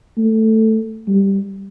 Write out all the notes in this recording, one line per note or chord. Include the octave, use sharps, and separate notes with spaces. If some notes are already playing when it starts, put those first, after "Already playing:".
A3
G3